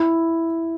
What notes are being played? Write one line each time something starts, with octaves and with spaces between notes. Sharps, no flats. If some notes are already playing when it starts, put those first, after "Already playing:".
Already playing: E4